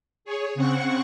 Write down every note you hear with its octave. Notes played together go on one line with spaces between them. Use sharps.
G#4 C#5
C#3 C4 F#5 C#6